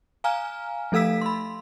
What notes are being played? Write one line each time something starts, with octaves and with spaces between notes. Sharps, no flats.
F5 G#5 A#5 F6
F3 A3 A4 F5 E6 B6
B5 C6